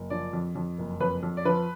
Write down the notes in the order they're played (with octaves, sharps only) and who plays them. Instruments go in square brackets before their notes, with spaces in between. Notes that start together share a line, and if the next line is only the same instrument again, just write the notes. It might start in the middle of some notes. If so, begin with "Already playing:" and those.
Already playing: [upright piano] F#1
F3 D5
F2
F2
F#1
F2 B4
F2
D5
F3 B4